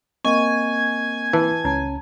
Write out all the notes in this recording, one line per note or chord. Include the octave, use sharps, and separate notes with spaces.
A#3 C4 D#5 G#5 C#6
E3 A5
C#2 C#4 A5 A#5 G#6